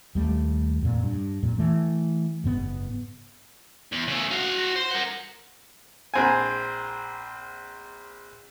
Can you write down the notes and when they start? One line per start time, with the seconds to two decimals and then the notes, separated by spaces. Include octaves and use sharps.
0.15 D#2 G3 A3
0.82 F2 A#2
1.03 G2
1.42 F2 A#2
1.58 E3 A3
2.44 F#1 G#2 B3
3.92 E2
4.08 C#3 A3
4.31 F#4 F5
4.76 C5
4.91 A#4 F#5
6.14 A#1 C4 G#5